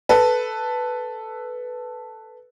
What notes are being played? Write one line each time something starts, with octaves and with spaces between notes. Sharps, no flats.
A4 B4